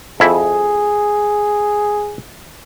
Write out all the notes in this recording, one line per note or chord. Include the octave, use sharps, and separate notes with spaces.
F2 E4 G#4